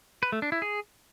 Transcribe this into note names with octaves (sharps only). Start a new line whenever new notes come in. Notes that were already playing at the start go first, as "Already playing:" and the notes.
B4
A3
D4
E4
G#4